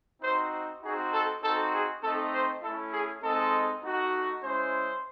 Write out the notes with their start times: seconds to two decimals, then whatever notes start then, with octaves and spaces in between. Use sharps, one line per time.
0.22 C4 D#4 F#4 C5
0.82 C4 D#4 F#4 G#4
1.12 A4
1.42 C4 D#4 F#4 A4
1.73 G#4
2.02 A3 C4 D#4 A4
2.33 C5
2.62 A3 C#4 E4 A4
2.92 G#4
3.22 G#3 C4 D#4 A4
3.82 A3 D#4 F#4
4.43 G#3 C#4 E4 C5